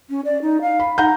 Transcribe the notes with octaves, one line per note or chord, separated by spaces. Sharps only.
C#4
D5
D#4
F5
B5
D#4 F#5 A#5 G6